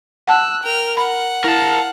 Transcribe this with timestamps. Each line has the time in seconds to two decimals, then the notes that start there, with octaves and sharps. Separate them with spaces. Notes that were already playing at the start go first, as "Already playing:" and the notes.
0.27 F#5 A5 E6 F#6
0.64 A#4 G5 F6
0.97 F#5 B5
1.44 E4 A#4 F5 A5